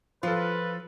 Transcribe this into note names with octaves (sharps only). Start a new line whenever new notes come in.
F3 F4 A4 B4